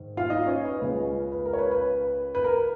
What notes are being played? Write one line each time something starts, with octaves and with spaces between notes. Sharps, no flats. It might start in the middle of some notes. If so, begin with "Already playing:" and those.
Already playing: G#2 D#3
F4 F5
D#4 D#5
C#4 C#5
B4
C#2 C#3 G#3 C#4 B4
B4
A#4
C#5
B4
B4
B4
A#4